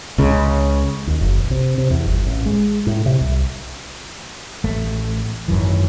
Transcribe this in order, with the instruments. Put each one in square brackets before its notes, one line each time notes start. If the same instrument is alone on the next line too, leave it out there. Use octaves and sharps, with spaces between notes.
[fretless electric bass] C#2 C#3
[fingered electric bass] D#2
F#1
B1
C3
C3
E2
G1
A1
G#3
A2
C3
C2
[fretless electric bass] A1 A3
G#1 F#2 E3